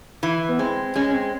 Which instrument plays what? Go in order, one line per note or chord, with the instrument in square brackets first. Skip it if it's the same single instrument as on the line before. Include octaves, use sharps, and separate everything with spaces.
[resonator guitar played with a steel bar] E3
[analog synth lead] B3
[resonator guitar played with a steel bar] G#3 [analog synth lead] C4
[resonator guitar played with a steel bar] G#3 [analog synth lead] C#4
[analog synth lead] C#4
C4